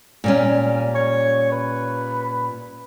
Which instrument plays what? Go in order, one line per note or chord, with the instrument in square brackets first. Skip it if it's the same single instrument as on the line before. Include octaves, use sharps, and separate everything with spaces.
[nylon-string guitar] A#2 G3 C#4
[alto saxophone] C#5
B4